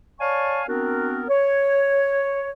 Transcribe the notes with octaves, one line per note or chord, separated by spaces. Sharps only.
C#5 D5 F5 G#5 A5 C#6
B3 C4 D4 F#4 A#4
C#5